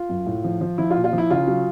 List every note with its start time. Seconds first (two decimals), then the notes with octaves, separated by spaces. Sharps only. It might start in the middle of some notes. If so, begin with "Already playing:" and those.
Already playing: F4
0.09 F#2
0.26 A2
0.44 F3
0.61 F3
0.78 F3 E4
0.90 F4
0.96 A#2
1.04 F4
1.13 F3
1.18 E4
1.30 C#3 F4
1.47 F#3